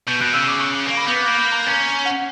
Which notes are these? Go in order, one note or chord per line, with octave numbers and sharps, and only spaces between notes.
B2 G6
B2 F#6
C#3 E6
D6
C#6
D6
A#3 D6
B5
B3 G6
F#6
A#3 G6
G6
A#5
C#4
F#5